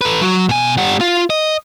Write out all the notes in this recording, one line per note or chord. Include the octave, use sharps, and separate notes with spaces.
A4 B4
F#3
B2 G#5
G3 F#5
F4
D#5